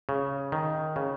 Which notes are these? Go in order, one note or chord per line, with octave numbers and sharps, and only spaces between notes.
C#3
D#3
C#3